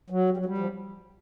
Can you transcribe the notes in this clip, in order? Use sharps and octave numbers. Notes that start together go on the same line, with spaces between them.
F#3
G3
F#3
G3
F3